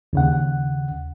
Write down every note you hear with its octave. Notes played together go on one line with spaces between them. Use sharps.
D#2 C#3 F#5